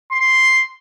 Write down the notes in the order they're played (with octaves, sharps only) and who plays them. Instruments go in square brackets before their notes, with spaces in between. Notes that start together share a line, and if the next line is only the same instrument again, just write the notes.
[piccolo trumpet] C6